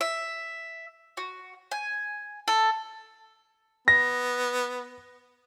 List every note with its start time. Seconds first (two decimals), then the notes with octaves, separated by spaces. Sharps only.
0.01 E5
1.17 F#4
1.71 G#5
2.48 A4
3.88 B3 A#6